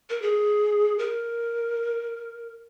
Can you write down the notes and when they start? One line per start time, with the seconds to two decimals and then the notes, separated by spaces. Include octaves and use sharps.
0.10 A#4
0.22 G#4
0.99 A#4